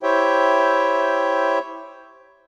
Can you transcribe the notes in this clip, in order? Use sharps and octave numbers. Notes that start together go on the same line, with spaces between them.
E4 G4 C5 C#5 E5 G5